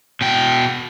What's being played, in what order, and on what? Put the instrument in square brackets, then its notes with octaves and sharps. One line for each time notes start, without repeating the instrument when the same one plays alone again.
[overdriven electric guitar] B2 G5